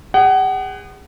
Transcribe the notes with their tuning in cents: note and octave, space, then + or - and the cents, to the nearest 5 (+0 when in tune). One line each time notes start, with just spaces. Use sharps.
G#4 -35 F#5 +30